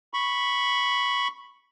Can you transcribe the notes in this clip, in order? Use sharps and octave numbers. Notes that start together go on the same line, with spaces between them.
B5 C#6